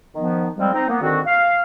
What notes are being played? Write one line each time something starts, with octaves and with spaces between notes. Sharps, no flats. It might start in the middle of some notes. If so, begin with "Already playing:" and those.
D#3 F3 B3
F2 G3 G#3 C4
C4 D#4
A#3 B3
G#2 D3 D#3 C4 F#4
F5